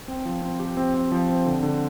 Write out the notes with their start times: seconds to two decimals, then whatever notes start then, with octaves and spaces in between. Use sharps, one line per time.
0.08 C4
0.25 F3
0.42 C4
0.60 G4
0.77 C4
0.94 C4
1.12 F3
1.29 C4
1.46 D3
1.63 D3